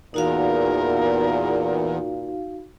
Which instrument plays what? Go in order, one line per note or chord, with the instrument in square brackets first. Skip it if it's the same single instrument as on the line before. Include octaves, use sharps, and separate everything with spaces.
[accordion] E2 [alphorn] A#2 [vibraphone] D#4 F#4 F5 [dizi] A#4